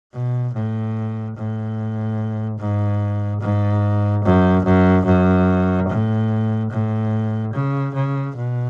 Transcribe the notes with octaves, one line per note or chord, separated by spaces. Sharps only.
B2
A2
A2
G#2
G#2
F#2
F#2
F#2
A2
A2
C#3
C#3
B2